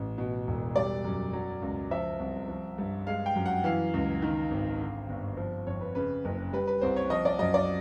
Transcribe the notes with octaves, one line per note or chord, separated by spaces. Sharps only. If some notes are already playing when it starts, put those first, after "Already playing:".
Already playing: A1
B2
E1
G3 D5
F#2
F#3
C#2
F3 E5
C2
F3
G2
G#3 F5
G5
F#2
F#5
E3 F5
C#2
D#3
G#1
D3
G1
F3
F2 C#5
B4
C#3 B4
F#1
G3 B4
B4
C2 C5
C#5
F3 D#5
D5
F#2 D#5
D5